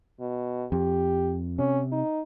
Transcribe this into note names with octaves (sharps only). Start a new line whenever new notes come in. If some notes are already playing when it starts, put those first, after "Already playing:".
B2
F2 G4
C3 C#4
D#4